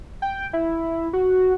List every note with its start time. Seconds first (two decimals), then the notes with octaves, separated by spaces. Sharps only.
0.22 G5
0.53 E4
1.13 F#4